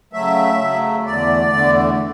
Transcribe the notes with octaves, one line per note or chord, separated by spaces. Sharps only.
C#3 F#3 A3 E5
C#3 F#3 A3
E2 D3 A3 D5
E2 D3 A3